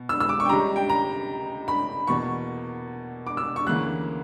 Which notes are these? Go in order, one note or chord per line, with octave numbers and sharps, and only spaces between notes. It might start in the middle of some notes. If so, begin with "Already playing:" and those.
Already playing: B2
E6
E6
D6
C#6
G5
C#2 C#3 G3 A#5
G5
A#5
B5
E2 B2 A#3 C#6
D6
E6
C#6
D2 C#3 E3 A#3 F#6